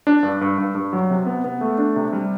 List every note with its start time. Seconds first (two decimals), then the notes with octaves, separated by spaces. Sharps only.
0.07 D4
0.23 G2
0.41 G2
0.58 G2
0.75 G2
0.93 F#3
1.10 C3
1.26 B3
1.44 B3
1.61 A3
1.78 D4
1.96 C3
2.13 G3